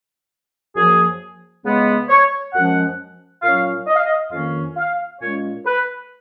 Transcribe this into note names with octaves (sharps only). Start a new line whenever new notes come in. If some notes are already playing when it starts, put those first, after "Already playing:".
F#2 F3 A#3 G#4
C#3 G#3 B3
C#5
F#2 F3 G#3 C#4 F#5
A#2 F#3 C#4 F5
D#5
F5
D#5
F2 D#3 A#3 C#4 F5
F5
A#2 G#3 C#4 C#5
B4